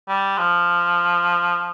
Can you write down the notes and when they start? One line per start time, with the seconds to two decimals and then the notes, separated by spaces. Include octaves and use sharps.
0.08 G3
0.38 F3